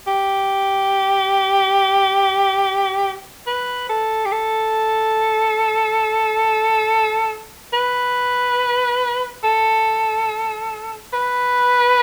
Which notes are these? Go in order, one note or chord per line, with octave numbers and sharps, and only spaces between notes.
G4
B4
A4
G4
A4
B4
A4
B4